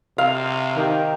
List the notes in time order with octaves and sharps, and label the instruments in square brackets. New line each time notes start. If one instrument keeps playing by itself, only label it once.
[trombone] C3 [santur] F5
[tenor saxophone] D#3 [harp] G4 G5 A#5